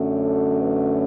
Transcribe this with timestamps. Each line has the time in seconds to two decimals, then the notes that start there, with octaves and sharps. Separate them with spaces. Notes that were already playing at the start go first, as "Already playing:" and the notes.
Already playing: F#2 D3 F#3 A3
0.21 A4
0.61 B4